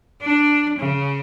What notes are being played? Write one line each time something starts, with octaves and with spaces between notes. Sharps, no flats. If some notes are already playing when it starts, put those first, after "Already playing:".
D4
C#3